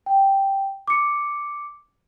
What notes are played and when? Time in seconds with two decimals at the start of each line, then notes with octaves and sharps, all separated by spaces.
0.06 G5
0.88 D6 C#7